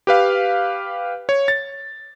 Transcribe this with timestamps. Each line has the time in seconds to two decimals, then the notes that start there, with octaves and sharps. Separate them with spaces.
0.07 G4 B4 F5
1.29 C#5
1.48 A6